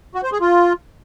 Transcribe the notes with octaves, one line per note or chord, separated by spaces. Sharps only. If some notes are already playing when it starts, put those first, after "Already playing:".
F#4
C5
G#4
F4